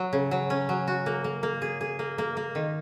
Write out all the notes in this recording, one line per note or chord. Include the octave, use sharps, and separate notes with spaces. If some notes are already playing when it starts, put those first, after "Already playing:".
Already playing: F#3
C#3
F#3
C#4
F#3
F#4
A#3
A#3
A#3
G#4
G#4
A#3
A#3
A#3
D#3